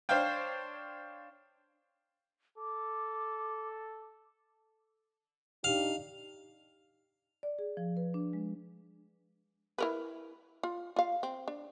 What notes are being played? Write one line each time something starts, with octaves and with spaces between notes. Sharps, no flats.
D4 C5 C#5 F5 G5
A4 D6
D4 D#4 G4 F5
D5
G#4
F3
B4
D4
G#3
E4 A#4 B4
F4
F4 F5
C4
D4